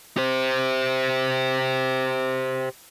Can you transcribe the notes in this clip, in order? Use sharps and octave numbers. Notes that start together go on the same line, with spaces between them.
G4 C5